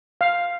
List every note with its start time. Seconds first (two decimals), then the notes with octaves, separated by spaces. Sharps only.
0.21 F5